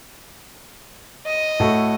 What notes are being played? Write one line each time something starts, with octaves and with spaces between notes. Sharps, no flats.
D#5
A2 F#4 A4